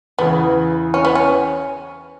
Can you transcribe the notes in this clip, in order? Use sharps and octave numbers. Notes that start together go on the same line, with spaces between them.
E2 C#3 E3 B3
C#4
B3
C#4